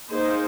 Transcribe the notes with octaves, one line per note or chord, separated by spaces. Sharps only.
A#3 D#4 G#4 C5